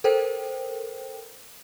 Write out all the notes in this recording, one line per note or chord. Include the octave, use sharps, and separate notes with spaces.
A4 A#4 C5 G5